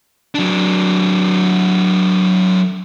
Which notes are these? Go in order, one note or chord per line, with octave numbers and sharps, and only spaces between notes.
F#3 D4